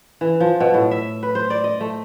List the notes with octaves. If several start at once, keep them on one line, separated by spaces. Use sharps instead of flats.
E3
F3
B2
A2
E5
B4
C5
D5
D#5
A3